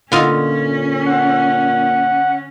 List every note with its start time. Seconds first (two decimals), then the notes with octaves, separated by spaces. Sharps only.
0.12 A#2 D3 C#4 F4 D#5
1.06 F#5